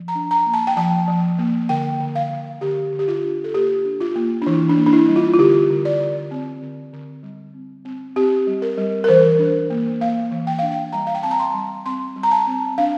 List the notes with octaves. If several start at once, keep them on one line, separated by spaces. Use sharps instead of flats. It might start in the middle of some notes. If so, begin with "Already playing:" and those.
Already playing: F3
A#5
D4
A#5
A#3
A5
G5
F3 A5
F3
A#3
D3 G5
D3
F5
D3
D3 G4
D3
G4
F4
D4
A4
A#3 G4
D4
F4
A#3
D4
E3 E4
D4
A#3
D4
E4
G3
F4
F4
D3 G4
D3
D5
D3
C4
D3
D3
G3
C4
C4
C4 G4
G3
A#4
G3
A#4
E3 C5
D4
A#3
A#3 F5
E3
G5
D4 F5
G5
G3 A#5
F5
G5
C4 A5
A#5
C6
G3
C4 C6
G3
A#5
A5
C4
D4 F5